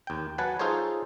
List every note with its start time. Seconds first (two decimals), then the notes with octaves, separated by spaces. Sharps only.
0.07 D#2 G5
0.38 F#3 B4 F#5 G#5 A5
0.59 D#4 F4 G#4 A4 C5 C#5